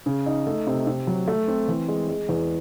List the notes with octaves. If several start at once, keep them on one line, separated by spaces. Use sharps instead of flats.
C#3
D#4
A3
C3
C3
F#3
A3
C4
E3
G#3
G#3
E2